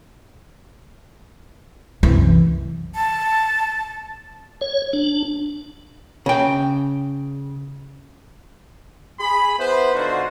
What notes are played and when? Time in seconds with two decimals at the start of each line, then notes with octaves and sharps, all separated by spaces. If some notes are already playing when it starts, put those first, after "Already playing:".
2.03 C2 F#2 C3 E3
2.95 A5
4.61 C#5
4.93 D4
6.26 C#3 G5
9.20 G#4 B5
9.59 B3 E4 B4 C5
9.94 D3 D#4 F4 F#4 C5